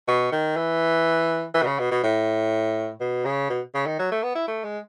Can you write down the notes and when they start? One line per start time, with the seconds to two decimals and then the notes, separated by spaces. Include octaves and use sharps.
0.08 B2
0.32 D#3
0.56 E3
1.54 E3
1.62 B2
1.66 C#3
1.79 B2
1.91 B2
2.03 A2
3.00 B2
3.25 C#3
3.50 B2
3.74 C#3
3.86 D#3
3.99 F#3
4.11 A3
4.23 B3
4.35 E4
4.48 A3
4.64 G#3